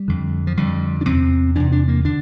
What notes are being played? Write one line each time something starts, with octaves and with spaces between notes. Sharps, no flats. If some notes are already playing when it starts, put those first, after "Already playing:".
Already playing: G3
F2 D3
F3
F2 D3 G3
D4
E2 C3 C4
E2 C3 D4
D4
A#3
D3 D4